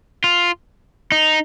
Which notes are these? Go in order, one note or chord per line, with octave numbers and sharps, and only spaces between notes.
F4
D#4